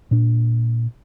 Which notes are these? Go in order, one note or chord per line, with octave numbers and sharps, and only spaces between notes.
A#2 D4